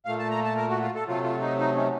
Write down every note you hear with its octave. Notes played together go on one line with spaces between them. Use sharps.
A#2 A3 F5
A5
A#5
A5
A#4
F#4
F4
A4
C3 F#3 A3 F4
F4
D#4
D#4
C#4